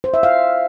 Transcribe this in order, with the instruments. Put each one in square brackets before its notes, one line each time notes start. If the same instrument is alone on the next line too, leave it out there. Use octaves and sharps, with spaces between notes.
[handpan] C5
E5
F5